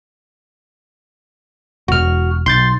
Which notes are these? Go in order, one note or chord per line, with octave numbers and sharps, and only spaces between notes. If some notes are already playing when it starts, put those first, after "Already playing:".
E1 F#4 F6
B1 C6 G6 A6